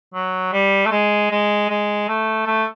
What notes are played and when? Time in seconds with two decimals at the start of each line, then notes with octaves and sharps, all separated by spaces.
0.14 F#3
0.53 G3
0.86 A3
0.92 G#3
1.31 G#3
1.70 G#3
2.09 A3
2.47 A3